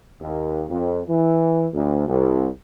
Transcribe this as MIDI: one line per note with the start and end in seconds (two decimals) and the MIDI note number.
0.21 0.65 39
0.69 1.01 41
1.07 1.66 52
1.73 2.05 38
2.07 2.47 36